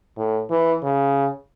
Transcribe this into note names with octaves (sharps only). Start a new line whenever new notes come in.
A2
E3
C#3